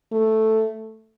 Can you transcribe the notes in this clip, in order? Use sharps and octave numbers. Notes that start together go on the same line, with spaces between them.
A3